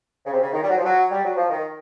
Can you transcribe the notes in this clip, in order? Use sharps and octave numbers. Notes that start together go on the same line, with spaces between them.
C#3
C3
C#3
D#3
G3
F#3
F3
F#3
G3
F#3
F3
D#3